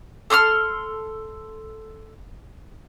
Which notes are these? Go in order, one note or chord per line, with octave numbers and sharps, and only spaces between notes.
A4 C6 D#6 F6